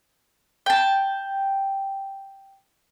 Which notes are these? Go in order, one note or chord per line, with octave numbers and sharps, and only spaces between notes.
G5 A5